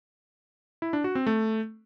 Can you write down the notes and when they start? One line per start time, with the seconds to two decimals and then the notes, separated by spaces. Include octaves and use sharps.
0.82 E4
0.93 D4
1.04 F#4
1.15 C4
1.27 A3